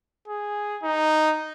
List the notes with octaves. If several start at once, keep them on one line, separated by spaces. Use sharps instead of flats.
G#4
D#4